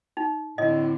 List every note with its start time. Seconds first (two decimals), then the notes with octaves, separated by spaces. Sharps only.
0.17 D#4
0.58 A2 D3 C4 D#5